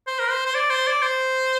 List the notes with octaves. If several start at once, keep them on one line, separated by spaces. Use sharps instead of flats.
C5
A#4
C5
C5
D5
C5
D5
C5